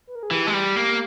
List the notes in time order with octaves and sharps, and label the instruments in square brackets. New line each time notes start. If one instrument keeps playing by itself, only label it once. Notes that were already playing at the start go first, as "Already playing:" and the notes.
[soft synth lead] B4
A#4
G#4
[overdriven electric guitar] E3 [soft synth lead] G4
[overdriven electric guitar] G#3
G3
A#3